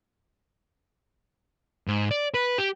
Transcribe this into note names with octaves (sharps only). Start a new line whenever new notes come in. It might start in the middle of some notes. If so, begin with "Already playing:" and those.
G#2
D5
B4
G4